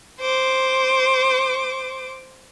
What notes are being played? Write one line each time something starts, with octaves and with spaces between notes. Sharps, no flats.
C5 D6